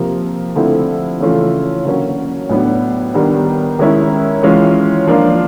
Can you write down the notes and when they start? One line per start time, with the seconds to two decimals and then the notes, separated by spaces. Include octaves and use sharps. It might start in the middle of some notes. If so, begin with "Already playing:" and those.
Already playing: C3 F3 A#3
0.56 D3 F3 A3 C4 E4
1.20 C#3 E3 A3 C#4 F4
1.85 D3 F#3 A#3 C#4
2.49 A2 F#3 B3 D4
3.14 D#3 G3 B3 D4
3.79 D#3 G#3 C#4 E4
4.43 E3 G#3 C#4 F4
5.07 F3 A#3 D4 F4